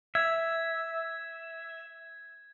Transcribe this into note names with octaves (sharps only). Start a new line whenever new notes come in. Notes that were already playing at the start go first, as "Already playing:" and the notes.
E5 G#6